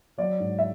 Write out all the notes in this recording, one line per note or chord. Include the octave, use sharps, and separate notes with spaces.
F#3 D5
G#2
E5